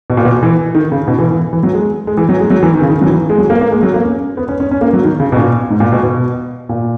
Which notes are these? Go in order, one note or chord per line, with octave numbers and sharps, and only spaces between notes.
B2
A#2
B2
E3
D#3
C#3
B2
E3
E3
E3
F#3
G#3
G#3
E3
F#3
G#3
F#3
E3
D#3
C#3
D#3
F#3
E3
G#3
F#3
A#3
A#3
G#3
F#3
A#3
C#4
B3
C#4
C#4
C#4
A#3
F#3
D#3
C#3
B2
A#2
G#2
A#2
B2
B2
A#2